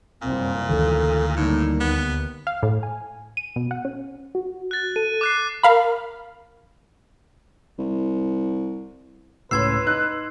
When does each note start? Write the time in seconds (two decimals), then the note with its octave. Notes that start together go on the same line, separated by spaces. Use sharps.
0.22 F#1 C2 F2 A#2 C4
0.69 D2 D#3 E3 A4
1.37 A2 D3 G3 A#3 D#4
1.81 D#2 B3
2.47 F5
2.63 A2
2.83 G#5
3.37 D#7
3.56 B2
3.71 F#5
3.85 C#4
4.35 F#4
4.71 F#6 A6
4.96 A4 D#7
5.21 D6 F#6 C7
5.63 A#4 F5 B5
7.78 C2
9.51 C#2 A2 C#3 B4 C6 E6 G#6 C7
9.87 D#4 F#6